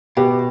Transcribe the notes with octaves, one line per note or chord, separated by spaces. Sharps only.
B2 G4